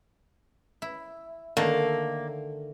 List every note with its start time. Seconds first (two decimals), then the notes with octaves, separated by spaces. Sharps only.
0.82 E4
1.57 D3 D#3 A3 A#3